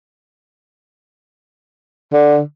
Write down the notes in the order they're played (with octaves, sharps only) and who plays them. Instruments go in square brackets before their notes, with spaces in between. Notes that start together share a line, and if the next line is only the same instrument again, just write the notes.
[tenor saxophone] D3